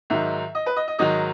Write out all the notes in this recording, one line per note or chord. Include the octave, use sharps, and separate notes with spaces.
G#2 D#3 F#3 E5
D#5
B4
D#5
D#5
G#2 D#3 F#3 D#5